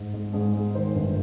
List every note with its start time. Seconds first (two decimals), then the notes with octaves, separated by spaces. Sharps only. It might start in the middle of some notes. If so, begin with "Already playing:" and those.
Already playing: G#2
0.14 G#3
0.33 G#2 G#4
0.54 G#3
0.75 D#3 C5
0.95 G1